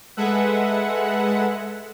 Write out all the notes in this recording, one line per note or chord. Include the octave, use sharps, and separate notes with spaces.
G#3 A4 B4 E5 F#5